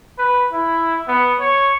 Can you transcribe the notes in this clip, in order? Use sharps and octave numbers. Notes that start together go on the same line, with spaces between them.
B4
E4
B3
C#5